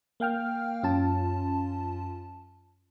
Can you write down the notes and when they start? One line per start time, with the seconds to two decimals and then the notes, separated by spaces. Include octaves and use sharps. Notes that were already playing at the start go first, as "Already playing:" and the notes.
0.20 A#3 F5 G5 F6
0.83 F#2 C#4 F4 A5